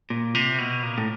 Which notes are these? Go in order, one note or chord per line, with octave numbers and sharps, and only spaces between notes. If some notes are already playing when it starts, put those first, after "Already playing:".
A#2
C3
B2
A#2
A2